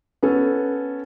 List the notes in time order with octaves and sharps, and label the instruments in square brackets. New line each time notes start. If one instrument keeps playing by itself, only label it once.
[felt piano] B3 C#4 A4